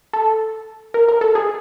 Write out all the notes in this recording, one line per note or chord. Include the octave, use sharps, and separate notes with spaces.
A4
A#4
A#4
A4
G#4